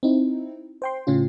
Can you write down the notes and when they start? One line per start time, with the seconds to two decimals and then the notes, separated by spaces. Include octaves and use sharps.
0.03 C4 D#4 E4
0.82 C5 G5 C6
1.07 A2 C#3 C#4 F4